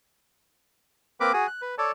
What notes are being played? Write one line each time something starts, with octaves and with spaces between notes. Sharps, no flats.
A#3 C4 A#4 B4 B5 D6
F#4 G#4 G#5
F#6
B4
A4 C#5 D5 A5